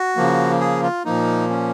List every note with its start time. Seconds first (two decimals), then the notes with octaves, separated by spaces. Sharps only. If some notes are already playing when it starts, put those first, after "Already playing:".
Already playing: F#4
0.16 C#3 F3 A#3
0.61 G#4
0.83 F4
1.05 A#2 F3 A#3 D#4
1.50 C#4